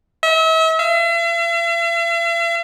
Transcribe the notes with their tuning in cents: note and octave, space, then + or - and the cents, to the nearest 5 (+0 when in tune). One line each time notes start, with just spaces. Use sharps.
E5 -40
E5 +45